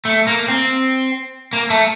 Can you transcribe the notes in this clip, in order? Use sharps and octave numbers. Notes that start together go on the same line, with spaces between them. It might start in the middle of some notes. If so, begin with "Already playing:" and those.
A3
A#3
C4
A#3
A3